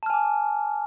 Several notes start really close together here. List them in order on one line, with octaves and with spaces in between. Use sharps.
A5 F6 G#5 D6